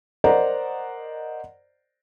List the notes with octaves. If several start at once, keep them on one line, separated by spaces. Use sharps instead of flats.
A#4 C5 D5 D#5 F#5 A#5